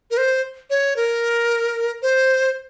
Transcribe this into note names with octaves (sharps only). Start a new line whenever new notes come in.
A#4
C5
C#5
A#4
C5